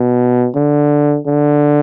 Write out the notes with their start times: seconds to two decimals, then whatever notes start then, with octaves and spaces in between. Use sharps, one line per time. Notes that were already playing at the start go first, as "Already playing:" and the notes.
Already playing: B2
0.55 D3
1.26 D3